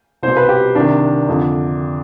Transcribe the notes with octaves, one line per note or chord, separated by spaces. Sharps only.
C2 B2 C5
B4
G4
C2 C3 D#3 D4
F2 D3